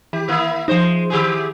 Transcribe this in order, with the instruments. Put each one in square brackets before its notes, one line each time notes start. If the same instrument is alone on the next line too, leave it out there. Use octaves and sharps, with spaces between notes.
[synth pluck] E3 [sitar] G4
[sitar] D#3 A#3 E4
[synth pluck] F3 D#4 [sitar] G#3 C5
[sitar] D#3 G4 G#4